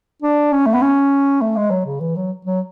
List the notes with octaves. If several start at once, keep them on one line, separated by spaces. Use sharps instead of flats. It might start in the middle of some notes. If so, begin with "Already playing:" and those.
D4
C#4
A3
B3
C#4
A3
G#3
F#3
C#3
E3
F#3
F#3